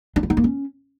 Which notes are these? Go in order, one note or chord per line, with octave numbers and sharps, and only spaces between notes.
D4
E4
D#4
A#3
C#4